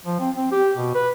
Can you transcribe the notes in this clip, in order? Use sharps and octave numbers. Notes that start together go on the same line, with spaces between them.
F3
C4
C4
G4
B2
B4